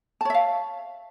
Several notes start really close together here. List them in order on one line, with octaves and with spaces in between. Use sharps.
A5 C#5 E5 F5